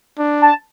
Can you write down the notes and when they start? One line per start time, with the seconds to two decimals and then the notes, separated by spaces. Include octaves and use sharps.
0.18 D4
0.42 A5